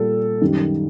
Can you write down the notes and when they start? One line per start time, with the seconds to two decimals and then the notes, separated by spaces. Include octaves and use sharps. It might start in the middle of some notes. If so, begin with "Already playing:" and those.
Already playing: A#2 G3 A4
0.41 F#2 D#3 G3